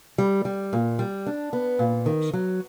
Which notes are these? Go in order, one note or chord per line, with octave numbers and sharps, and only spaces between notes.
G3
G3
A#2
G3
D4
B3
A#2
D#3
F#3